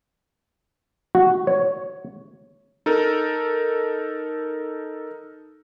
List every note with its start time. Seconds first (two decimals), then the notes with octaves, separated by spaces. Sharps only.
1.15 F#4
1.47 C#5
2.86 D#4 A4 A#4